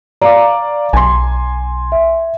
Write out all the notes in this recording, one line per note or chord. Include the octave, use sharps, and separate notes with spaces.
D5 F5 A#5 D6
B1 G#5 C6
E5